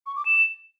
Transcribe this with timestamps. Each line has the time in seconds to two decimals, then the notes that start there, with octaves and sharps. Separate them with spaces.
0.06 C#6
0.16 D6
0.26 E7